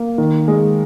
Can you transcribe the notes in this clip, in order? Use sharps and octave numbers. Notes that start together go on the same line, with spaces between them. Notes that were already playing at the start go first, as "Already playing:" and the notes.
Already playing: A#3
D#3
G#3